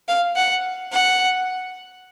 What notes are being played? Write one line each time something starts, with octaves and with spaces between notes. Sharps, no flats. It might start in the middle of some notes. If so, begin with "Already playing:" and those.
F5
F#5
F#5